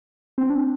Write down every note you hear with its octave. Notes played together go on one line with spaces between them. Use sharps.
C4
D4